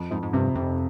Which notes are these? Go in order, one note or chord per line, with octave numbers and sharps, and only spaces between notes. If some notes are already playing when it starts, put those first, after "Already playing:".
Already playing: F2
F2 G#2
G#2
G2 C3
F2 C3